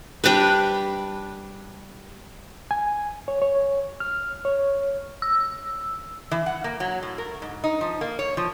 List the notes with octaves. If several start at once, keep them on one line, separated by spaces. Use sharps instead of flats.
G3 D4 G4 B4
G#5
C#5
C#5
F6
C#5
E6
E3
F#5
A#3
F#3
A2
A#4
G#2
D#4
F3
A#3
C#5
F3